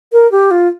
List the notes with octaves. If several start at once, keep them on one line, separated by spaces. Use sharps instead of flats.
A#4
G4
F4